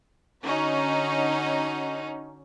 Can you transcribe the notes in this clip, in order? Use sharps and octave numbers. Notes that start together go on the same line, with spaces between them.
D3 C#4 D#4 F#4